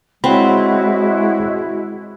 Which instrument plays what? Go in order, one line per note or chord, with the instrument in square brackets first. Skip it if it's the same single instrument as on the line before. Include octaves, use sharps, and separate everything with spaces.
[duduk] G#3 [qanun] C4 [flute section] E4 F#4 [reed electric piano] C#5 F#5 B5